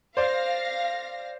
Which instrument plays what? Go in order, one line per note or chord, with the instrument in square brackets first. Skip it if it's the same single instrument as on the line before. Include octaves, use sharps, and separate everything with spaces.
[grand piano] C5 D5 [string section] F5 A#6